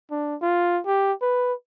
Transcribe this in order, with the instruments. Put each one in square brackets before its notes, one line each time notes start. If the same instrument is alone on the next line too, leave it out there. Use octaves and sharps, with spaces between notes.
[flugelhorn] D4
F4
G4
B4